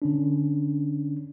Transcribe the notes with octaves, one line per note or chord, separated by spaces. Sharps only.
D3 C#4 D4